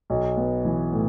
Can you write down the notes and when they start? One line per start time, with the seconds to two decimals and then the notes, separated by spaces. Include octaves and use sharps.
0.10 B1
0.37 B3
0.65 E3
0.92 A2